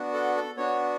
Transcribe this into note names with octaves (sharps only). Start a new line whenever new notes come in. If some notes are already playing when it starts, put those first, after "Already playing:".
Already playing: B3 D4 F#4
A4
A4
B3 D4 F#4 C#5